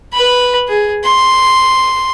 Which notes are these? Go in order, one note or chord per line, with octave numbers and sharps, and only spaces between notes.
B4 B5
G#4
C6